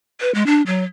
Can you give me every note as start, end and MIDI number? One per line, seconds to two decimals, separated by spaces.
0.21 0.33 71
0.35 0.46 56
0.46 0.62 62
0.66 0.83 54